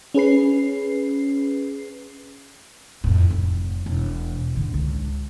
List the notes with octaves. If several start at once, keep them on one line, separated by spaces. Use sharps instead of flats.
C#4 G#4 B4 C7
F2 A2
F1
E1
G#2 D3
C#2